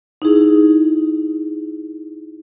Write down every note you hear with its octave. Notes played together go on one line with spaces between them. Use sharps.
D#4 E4 G#4